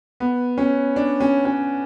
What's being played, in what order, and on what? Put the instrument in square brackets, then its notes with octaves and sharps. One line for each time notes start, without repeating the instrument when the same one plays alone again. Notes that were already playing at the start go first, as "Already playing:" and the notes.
[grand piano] B3
C#4
D4
C#4
C#4